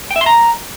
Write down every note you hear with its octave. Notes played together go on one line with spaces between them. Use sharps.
G5
E5
C6
A#5